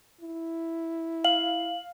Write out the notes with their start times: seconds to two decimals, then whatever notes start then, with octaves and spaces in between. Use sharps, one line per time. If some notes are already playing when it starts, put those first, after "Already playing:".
0.21 E4
1.25 F5 F#7